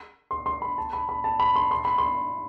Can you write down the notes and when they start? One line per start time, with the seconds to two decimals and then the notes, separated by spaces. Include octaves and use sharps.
0.31 C6
0.46 C6
0.62 B5
0.78 A5
0.93 B5
1.09 B5
1.24 A5
1.40 B5
1.56 C6
1.71 C6
1.85 B5
1.98 C6